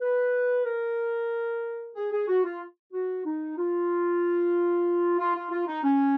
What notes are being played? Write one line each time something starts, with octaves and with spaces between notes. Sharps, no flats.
B4
A#4
G#4
G#4
F#4
F4
F#4
D#4
F4
F4
F4
F4
D#4
C#4